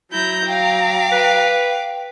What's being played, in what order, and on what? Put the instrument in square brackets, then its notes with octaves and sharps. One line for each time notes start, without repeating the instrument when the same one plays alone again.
[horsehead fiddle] F#3 A#5 [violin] E4 G6
[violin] F5 D6 [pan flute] G5
[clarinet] B4